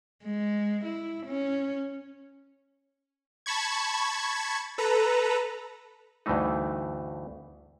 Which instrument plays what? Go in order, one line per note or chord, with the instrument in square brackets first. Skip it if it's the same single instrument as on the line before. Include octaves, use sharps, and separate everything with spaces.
[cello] G#3
E4
C#4
[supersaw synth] A5 B5 C#6 G#6
A4 B4 A#5
[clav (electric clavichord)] D2 G2 E3 A3 D#4